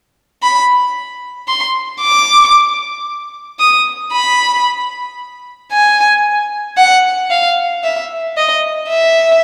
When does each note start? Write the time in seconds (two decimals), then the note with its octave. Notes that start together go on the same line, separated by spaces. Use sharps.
0.43 B5
1.48 C6
2.01 D6
3.60 D#6
4.13 B5
5.72 G#5
6.77 F#5
7.30 F5
7.84 E5
8.37 D#5
8.89 E5